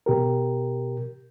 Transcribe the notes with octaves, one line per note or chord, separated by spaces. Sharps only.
B2 G4 A#4